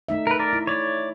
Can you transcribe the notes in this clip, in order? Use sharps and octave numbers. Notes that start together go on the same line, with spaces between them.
A3 D#4 E5
A#4 B4
A#4 D5
E4
C#5 D5